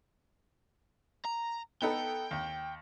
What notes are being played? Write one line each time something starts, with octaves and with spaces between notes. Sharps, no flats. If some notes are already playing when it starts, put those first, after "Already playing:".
A#5
B3 D#4 A4 G5
D#2